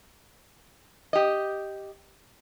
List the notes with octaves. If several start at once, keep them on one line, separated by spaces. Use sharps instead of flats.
G4 D#5